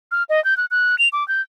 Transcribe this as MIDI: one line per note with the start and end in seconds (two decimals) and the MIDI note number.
0.11 0.23 89
0.29 0.42 75
0.44 0.57 91
0.57 0.65 90
0.71 0.98 90
0.99 1.08 101
1.13 1.26 86
1.28 1.41 91